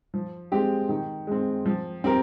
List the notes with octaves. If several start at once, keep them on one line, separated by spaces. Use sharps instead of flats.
F3
G#3 C4 G4
D#3
G#3 C4
F3
C4 G4 A#4